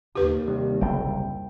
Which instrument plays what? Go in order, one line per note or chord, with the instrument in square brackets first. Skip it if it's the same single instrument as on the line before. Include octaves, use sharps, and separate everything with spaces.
[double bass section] D#2 [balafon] G4 B4
[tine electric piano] C3 D#3 G3
[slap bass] F#1 C2 [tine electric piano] G5